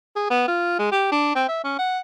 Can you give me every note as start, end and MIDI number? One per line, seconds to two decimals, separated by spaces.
0.16 0.27 68
0.30 0.43 59
0.48 0.77 65
0.79 0.89 56
0.92 1.09 67
1.12 1.33 62
1.35 1.45 60
1.48 1.61 76
1.64 1.76 61
1.79 1.99 78